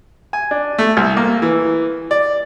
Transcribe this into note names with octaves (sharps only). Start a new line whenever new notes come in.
G#5
D4
A3
C2
A#3
E3
D5